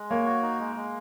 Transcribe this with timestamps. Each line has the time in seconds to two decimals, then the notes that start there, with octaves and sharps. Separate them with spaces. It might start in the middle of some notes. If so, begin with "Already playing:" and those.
Already playing: G#3
0.10 A#3 C#5
0.26 F#4
0.42 D#4
0.60 G#3
0.76 G#3